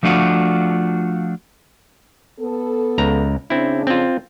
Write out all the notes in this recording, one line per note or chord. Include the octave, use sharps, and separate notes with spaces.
F3 A3 D4 F4 F#4
B3 A4
C#2 A#5
C#3 C4 D4 E4
C4 F4